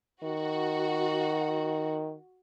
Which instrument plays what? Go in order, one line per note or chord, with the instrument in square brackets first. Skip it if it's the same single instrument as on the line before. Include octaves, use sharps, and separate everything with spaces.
[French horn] D#3 [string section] F#4